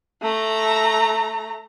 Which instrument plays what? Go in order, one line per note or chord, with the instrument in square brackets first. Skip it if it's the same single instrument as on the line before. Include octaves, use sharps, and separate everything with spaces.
[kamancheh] A3 A#5